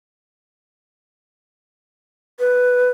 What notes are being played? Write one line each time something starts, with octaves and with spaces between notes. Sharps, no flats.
B4